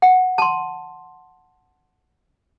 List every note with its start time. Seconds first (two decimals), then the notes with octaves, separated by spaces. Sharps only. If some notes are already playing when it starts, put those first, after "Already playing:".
0.02 F#5
0.38 A5 C6